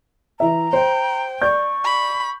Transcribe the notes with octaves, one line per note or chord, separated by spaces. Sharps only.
E3 E5 A#5
C5 G5
D5 C#6 G6
B5